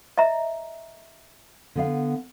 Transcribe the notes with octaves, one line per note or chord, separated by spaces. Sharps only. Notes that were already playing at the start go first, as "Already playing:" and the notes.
D#5 E5 A#5
D3 B3 F5